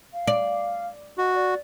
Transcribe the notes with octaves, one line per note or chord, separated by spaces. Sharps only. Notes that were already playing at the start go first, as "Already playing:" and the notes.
F5
D5
F#4 D#5
D5